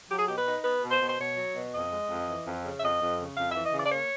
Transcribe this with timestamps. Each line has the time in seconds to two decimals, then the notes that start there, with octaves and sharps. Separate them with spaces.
0.10 F#3 G4
0.18 G#4
0.26 B2 G4
0.37 B4
0.46 D#4
0.64 B3 B4
0.83 B2
0.91 C5
1.01 B2
1.08 C5
1.18 B2 C#5
1.36 F#3
1.55 B2
1.73 F2 D#5
1.92 G#3
2.10 F2
2.28 E3
2.46 F2
2.65 C#3
2.79 E5
2.83 F2 D#5
3.00 F2
3.20 C#3
3.37 F2 F5
3.51 E5
3.55 E3
3.65 D#5
3.73 C#3 D5
3.86 D5
3.92 A#3 C#5